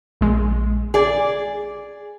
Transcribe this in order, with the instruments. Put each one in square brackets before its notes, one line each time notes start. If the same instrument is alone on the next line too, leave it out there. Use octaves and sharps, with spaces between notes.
[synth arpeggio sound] A#1 G#3
[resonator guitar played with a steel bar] G#4 D5